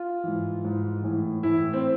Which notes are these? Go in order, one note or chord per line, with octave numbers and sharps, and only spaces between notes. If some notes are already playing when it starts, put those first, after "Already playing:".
Already playing: F4
G#2 E3
G#2 E3
A2 E3
A2 E3 E4
C4